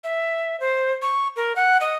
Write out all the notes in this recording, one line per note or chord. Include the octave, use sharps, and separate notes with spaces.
E5
C5
C#6
A#4
F#5
D#5